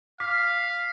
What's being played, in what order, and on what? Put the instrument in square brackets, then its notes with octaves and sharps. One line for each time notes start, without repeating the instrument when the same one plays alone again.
[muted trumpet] F5 [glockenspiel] D6 B6